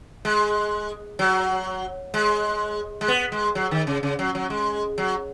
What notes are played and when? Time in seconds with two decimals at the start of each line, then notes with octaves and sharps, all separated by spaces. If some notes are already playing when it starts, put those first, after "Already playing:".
0.25 G#3
1.19 F#3
2.14 G#3
3.01 G#3
3.08 B3
3.32 G#3
3.55 F#3
3.71 D#3
3.87 C#3
4.03 C#3
4.19 F#3
4.35 F#3
4.50 G#3
4.98 F#3